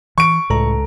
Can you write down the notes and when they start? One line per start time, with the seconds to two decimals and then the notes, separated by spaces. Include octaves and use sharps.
0.18 E3 C#6 D7
0.50 C#2 A2 A4 A#5